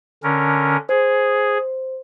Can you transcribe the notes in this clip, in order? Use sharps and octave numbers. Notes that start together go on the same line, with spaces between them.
D3 C#4 A#4
G#4 C5